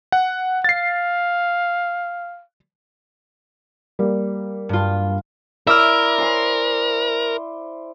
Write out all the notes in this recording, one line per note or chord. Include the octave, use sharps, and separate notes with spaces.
F#5
F5 A6 C7
G3 A#3
G2 F4
E4 A#4 D5 E5 C#6 F6
C5 G#5 C6